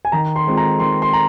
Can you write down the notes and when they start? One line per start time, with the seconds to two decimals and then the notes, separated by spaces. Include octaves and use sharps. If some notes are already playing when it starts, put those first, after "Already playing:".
0.05 G#5
0.12 D#3 A#5
0.36 C6
0.47 G#3 C4 F4
0.57 A#5
0.80 D#3 C6
1.02 C6
1.13 A#5